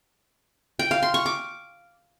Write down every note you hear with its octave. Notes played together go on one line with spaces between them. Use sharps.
G5
F5
C6
C#6
D6